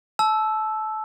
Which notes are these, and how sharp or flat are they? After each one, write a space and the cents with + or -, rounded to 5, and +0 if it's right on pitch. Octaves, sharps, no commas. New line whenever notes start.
A5 -25 E6 +0